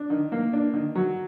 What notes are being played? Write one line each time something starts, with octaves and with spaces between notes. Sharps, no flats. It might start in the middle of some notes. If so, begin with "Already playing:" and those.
Already playing: D4
D#3
A#3
D4
D#3
F#3